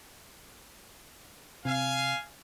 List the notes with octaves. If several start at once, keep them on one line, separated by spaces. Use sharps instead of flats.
C3 F5 G#5